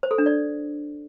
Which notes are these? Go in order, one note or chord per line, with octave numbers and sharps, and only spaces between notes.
C5
A4
D4
D5